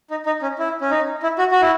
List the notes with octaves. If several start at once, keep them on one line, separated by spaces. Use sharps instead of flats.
D#4
D#4
C#4
E4
C#4
D#4
E4
F#4
F#4
E4